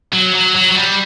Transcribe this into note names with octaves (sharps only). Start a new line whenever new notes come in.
F#3
F#3
F#3
F#3
G3